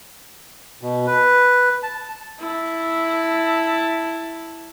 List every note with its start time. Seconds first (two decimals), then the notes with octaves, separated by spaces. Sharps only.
0.82 B2
1.07 B4
1.83 A5
2.39 E4 A5